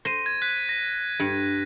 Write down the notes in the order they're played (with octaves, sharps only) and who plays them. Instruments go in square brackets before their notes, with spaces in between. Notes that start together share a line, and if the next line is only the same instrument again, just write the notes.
[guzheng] C5 [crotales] A#6 D#7
[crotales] G#6
F#6 B6
A#6
[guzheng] G2